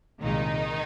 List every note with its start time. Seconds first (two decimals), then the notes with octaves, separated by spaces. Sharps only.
0.22 C2 A#2 D#3 G#3 D#4